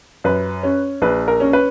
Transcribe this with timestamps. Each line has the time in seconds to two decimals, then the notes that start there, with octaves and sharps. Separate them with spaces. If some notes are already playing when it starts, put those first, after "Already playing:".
0.24 F#2 B4
0.63 C#4
1.02 A#1 B4
1.28 A#4
1.40 C#4
1.53 B4